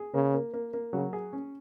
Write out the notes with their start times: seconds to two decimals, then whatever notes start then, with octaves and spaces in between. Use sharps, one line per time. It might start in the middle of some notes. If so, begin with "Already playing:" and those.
Already playing: G#4
0.14 C#3 A#3
0.34 A#3
0.54 A#3
0.73 A#3
0.93 C#3 F#3
1.13 G#4
1.33 C#4